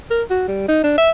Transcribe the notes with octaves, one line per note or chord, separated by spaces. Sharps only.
A#4
F#4
G3
D#4
D4
E5